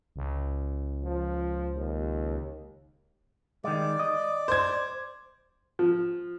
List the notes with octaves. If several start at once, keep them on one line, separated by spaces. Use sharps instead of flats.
C#2
F3
D#2
D#3 G3 G#3 D5
D#5
C5 G#6
F3